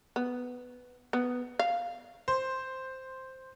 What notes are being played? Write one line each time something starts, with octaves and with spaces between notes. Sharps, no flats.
B3
B3
F5
C5